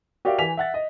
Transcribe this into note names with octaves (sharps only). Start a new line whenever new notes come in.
F#4 G4 A#4 D5 E5 F5
E3 G#5 B6 F7
E5 F#5 A6
D#5